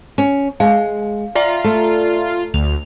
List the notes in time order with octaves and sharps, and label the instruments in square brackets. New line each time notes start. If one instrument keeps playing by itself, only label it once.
[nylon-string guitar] C#4
[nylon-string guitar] G#3 [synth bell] F5
[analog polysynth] F4 [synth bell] D5 E5 A#5
[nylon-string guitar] A3
[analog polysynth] D2 [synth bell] F7